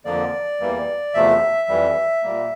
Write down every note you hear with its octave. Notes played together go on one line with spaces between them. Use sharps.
F2 D3 F3 A#3 D5
E2 E3 G3 A#3
E2 C3 F3 A3 E5
F2 E3 G3
A#2 G3 A#3